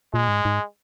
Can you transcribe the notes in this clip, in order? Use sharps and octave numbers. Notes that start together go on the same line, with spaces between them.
A#2 G#3
G#2
G#2